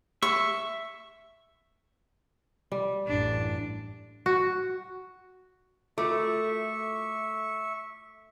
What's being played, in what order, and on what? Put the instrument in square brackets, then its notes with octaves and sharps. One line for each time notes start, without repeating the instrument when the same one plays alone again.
[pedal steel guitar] E5 [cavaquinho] C#6
[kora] G3
[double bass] A1 F#2 [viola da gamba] D4
[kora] F#4
[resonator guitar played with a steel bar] A3 [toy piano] F4 F#4 A#4 [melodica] E5 C#6 [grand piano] D6